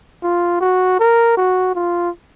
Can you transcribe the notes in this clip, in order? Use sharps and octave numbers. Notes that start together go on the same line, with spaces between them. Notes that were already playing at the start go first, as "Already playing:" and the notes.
F4
F#4
A#4
F#4
F4